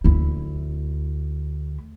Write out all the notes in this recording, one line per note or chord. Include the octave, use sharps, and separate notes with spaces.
D2 E4